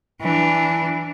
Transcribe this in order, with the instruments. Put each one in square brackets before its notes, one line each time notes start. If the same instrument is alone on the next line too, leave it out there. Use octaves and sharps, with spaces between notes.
[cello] E3 D4